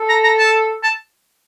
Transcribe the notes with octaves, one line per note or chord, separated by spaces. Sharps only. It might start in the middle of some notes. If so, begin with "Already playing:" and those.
Already playing: A4
A#5
A#5
A5
A5